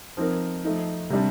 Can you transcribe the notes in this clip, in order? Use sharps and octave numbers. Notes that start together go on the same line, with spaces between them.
F3 C4 D#4 A#4
F3 A3 D#4
C3 G3 D4